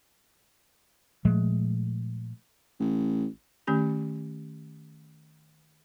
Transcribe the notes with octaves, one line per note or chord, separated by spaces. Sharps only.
A#2 F3 G#3 A3
A1
D#3 A3 C#4 G4